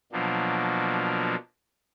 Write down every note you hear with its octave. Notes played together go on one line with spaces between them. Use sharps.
B2 F3 F#3 A#3 D4